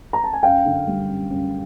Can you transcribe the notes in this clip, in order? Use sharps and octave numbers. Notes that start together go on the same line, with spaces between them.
A#5
A5
G#5
F#2 F5 G5
D3
G3
F#2
F#2